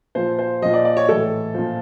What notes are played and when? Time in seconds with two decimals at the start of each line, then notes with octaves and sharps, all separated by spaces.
0.15 A#2 F3 C5
0.39 C5
0.62 A#2 F3 D#5
0.74 D5
0.85 D5
0.97 C#5
1.08 A2 E3 A4
1.54 A#2 F3